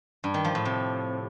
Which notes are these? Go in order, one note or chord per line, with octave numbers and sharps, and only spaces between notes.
G2
D#3
F3
A2
C3